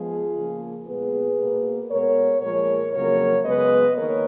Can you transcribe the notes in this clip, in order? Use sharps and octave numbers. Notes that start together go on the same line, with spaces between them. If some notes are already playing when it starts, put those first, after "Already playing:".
Already playing: F3 G#3 B3 F4 G#4
C#3 F3 A#3
A#2 G#3 B3 G#4 B4
B2 A#3
B2 G#3 B3 A#4 C#5
A#2 F3 G#3 A#4 C#5
F2 C#3 F#3 A#3 A#4 C#5
F#2 C#3 G#3 B3 B4 D#5
D#3 A#3 A#4 C#5